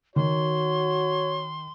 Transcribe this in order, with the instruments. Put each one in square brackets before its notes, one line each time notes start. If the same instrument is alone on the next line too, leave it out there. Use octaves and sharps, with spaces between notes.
[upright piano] D#3 [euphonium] F#4 [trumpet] C#5 [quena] C6